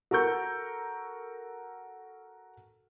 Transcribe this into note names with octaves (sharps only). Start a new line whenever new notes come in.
F#4 A4 A#4 C#6 G6